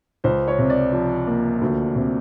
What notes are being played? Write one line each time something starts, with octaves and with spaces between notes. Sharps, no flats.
C#2 C5
C#5
C3
D5
F3
A#3
D2
C3